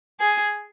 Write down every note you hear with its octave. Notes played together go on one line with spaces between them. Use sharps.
G#4